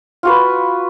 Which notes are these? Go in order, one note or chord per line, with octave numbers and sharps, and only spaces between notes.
F4 F#4 B4